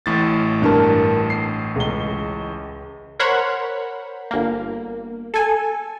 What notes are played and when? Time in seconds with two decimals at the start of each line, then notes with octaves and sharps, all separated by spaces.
0.06 A1 A2 A6
0.62 G2 A#4 A5
1.30 C7
1.76 C#2 G7
3.19 A#4 C5 C#5 F#5 B5
4.31 G1 A#3
5.34 A4 G#5